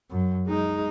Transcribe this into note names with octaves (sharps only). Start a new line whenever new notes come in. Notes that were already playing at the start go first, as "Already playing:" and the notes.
F#2
G#3 D#4